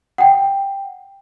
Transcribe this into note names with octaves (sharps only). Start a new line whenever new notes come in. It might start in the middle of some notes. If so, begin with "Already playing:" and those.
F#5 G5